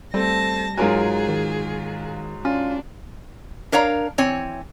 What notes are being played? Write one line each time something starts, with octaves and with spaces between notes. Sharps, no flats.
G3 A3 C4 A5 A#6
G#2 F#3 F4 G#4 A#4 G#5
D#3
C#4 D4 F4
D4 A#4 C#5 F5 A#5
E3 C4 C#5 G#5